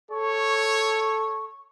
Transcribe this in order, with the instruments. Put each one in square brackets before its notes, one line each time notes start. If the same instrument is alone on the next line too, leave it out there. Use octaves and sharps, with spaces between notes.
[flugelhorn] A4 [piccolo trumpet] C#5 [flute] C#6